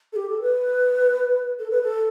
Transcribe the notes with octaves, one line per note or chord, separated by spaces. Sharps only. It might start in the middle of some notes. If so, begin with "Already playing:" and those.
A4
G4
A4
B4
A4
B4
A4